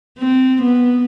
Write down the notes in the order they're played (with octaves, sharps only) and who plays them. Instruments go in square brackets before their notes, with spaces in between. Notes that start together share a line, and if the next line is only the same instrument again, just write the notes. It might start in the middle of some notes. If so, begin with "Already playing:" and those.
[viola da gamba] C4
B3